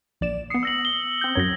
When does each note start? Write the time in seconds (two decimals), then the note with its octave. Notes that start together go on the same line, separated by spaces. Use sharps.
0.21 A#1 D5 E7
0.50 B3 D#6 C7 C#7
0.63 E6 A#6 F#7
0.85 G7
1.21 C4 G6
1.35 F#2 F#3 G#6 A#6